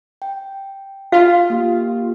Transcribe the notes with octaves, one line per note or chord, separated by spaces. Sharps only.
G5
F4 F5
A#3 G4